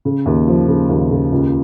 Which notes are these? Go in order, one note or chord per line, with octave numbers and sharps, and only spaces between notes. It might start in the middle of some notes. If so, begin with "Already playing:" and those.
C#3
D#2
F3
C#3
D#2
C#3
C#2